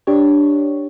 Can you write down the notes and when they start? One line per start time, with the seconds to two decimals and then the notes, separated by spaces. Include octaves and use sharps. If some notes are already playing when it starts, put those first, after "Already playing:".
0.07 D4 G4 C#5